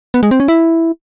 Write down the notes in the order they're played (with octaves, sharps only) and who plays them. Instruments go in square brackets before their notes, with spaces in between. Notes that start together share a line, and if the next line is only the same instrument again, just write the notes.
[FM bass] B3
G#3
C4
C#4
E4